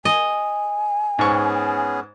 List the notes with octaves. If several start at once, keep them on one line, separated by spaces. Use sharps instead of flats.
D#5 G#5
G#2 B3 C#4 G#4 C#6